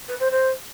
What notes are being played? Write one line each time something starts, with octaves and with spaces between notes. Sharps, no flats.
B4
C5
C5